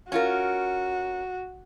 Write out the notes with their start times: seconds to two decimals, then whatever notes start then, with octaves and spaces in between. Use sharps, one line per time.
0.12 C#4 F4 F#4 A#4